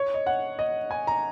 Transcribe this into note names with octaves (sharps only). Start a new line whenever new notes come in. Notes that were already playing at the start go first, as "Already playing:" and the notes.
Already playing: C#5
D#5
F#5
D#5
G#5
A#5